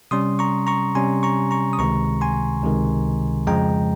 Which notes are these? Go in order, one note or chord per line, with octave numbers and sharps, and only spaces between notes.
C3 G3 C#4 C6 D#6
A#5 C#6
A#5 C#6
C3 G3 C#4 G#5 C6
A#5 C#6
A#5 C#6
D#6
C#2 C3 D#3 G#3 A#5 C#6
G#5 C6
C#2 C3 D#3 G#3
F2 C#3 F3 G#3 G5 A#5